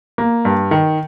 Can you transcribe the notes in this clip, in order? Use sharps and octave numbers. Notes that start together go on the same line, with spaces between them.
A#3
G2
D#3